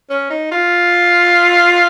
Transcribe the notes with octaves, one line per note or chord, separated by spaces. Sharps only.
C#4
D#4
F4